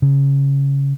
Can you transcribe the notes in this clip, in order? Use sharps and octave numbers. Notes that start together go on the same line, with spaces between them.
C#3